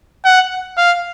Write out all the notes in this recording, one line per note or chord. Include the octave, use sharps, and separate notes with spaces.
F#5
F5